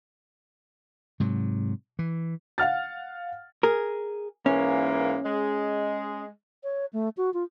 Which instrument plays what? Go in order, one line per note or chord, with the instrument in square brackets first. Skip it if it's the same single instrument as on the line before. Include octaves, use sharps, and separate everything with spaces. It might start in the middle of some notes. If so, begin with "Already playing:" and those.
[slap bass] G#2 C3 F#3
E3
[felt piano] F5 F#5 F6 A6
[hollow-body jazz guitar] G#4 A#4
[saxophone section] G#2 E3 A#3 [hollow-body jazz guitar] C#4
[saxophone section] G#3
[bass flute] C#5
A3
F#4
F4